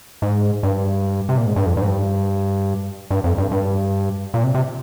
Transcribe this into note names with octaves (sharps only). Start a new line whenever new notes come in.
G#2
G2
C3
A#2
G#2
G2
F2
G2
G#2
G2
G2
F2
G2
G2
A#2
C3
C3